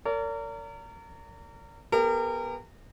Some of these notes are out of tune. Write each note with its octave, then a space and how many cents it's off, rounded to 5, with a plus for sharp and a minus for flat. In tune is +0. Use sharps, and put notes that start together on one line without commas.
A#4 -30 D5 -45
B3 -20 G4 +40 A#4 -30